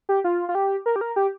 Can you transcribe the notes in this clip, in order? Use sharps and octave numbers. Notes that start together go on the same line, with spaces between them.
G4
F4
F4
G4
A#4
G4
A#4
G4